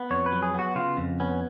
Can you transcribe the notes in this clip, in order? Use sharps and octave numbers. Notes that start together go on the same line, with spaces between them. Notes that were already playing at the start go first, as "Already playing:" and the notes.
Already playing: B3
F2 C#5
B4
F#3
G#4
B3 F#4
C#3 F4
F2
B3 C#4